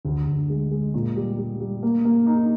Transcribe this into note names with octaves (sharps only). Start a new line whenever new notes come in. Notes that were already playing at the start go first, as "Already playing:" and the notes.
D2
D2
G#3
G#3
A#2
G3
G3
G3
A#3
A#3
D#4